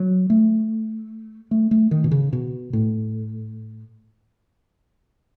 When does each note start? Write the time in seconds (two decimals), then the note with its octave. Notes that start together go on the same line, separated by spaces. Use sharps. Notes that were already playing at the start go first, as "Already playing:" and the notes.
Already playing: F#3
0.30 A3
1.51 A3
1.71 A3
1.91 D#3
2.04 B2
2.11 C#3
2.33 B2
2.73 A2